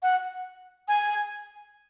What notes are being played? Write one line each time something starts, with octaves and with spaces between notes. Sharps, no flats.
F#5
G#5